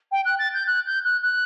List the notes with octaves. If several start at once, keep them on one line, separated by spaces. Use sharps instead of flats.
G5
F#6
A6
G6
F#6
G6
F#6
F#6